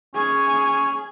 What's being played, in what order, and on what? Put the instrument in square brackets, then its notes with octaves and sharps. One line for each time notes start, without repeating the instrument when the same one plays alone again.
[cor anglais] C#4 [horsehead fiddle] G#4